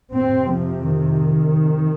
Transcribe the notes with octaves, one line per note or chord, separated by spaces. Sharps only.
F2 C3 C4
F3
D#3